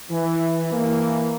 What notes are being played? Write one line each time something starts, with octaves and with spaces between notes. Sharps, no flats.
E3
E3 A#3